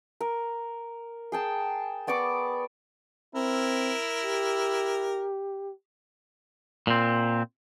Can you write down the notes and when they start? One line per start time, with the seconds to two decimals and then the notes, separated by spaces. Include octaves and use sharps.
0.21 A#4
1.32 G#4 G5 A5
2.07 B3 D5 C#6 D6
3.35 C4 E4 A#4
4.24 G4
6.87 A#2 C4